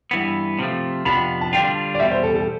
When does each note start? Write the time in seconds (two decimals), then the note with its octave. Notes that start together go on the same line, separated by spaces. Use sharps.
0.11 G2 E3 B3
0.59 C3 F3 A3
1.05 F2 C3 F3 B3 D4 B5
1.41 A5
1.53 D3 G3 D4 F4 G5
1.95 D5
2.00 E2 B2 G3 E5
2.11 C5
2.23 A4
2.35 A4